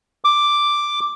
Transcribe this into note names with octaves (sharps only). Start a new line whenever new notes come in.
D6